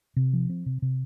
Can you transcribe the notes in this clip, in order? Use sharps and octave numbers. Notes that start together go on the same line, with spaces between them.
C3
F3
C4
C3
C3